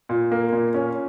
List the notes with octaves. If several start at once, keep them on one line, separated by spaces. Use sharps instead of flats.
A#2
A#3
A#2
C#4